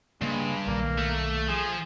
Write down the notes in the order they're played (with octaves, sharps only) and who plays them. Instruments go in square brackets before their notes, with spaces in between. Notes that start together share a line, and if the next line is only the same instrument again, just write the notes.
[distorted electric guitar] G2 [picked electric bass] C#3 A#3 [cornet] G#3
[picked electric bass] B1 A#2 D#3 [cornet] A#3
[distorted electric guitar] A3
[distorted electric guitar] F3 [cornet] G#4